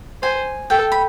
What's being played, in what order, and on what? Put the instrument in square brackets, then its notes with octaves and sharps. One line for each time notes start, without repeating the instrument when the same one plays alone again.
[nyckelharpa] C5 [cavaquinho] G#5
[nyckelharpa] A4 [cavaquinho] G5
[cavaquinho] B5